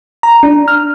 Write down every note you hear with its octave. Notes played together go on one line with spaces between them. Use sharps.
A#5
D4
F6